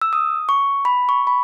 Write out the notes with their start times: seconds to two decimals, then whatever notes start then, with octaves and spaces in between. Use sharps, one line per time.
0.02 E6
0.13 D#6
0.49 C#6
0.85 B5
1.09 C#6
1.27 B5